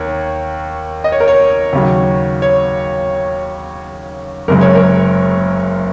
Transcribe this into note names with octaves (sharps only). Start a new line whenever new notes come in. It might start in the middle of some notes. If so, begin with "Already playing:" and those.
Already playing: D#2 A#4 C#5
D#5
C#5
A#4
C#5
D#2 C#3 F#3
C#5
F#1 F#2 C#3 G#3 A#4
C#5
A#4